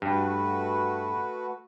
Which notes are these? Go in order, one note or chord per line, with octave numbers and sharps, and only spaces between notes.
G2 A3 F#4 B4